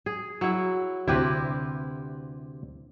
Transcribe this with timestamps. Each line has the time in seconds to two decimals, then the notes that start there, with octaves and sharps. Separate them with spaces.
0.06 G#4
0.41 F#3 E4
1.08 D2 C3 E4 G4 B4